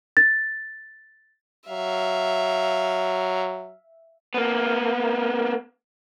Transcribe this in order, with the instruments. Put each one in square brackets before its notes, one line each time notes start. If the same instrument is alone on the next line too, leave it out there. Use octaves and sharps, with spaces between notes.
[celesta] A6
[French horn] F#3 [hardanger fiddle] E5 F5
[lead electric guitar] A#3 B3